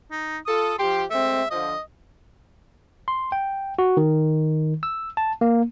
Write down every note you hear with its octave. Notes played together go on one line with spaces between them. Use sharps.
D#4
F4 A4 D#6
F3 G4 C6
G#3 A3 C4 E5
D3 F3 D#5
C6
G5
F#4
D#3
E6
A5
A#3